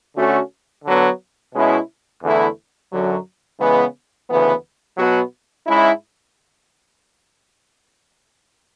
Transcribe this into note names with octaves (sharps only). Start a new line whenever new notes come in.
D3 A3 C#4 F#4
D3 F#3 B3
B2 G#3 C#4 E4
E2 D3 A3 E4
F#2 D3 F#3
C#3 E3 G#3 B3
D2 C#3 E3 B3
B2 F#3 B3 F#4
G#2 G#3 C#4 E4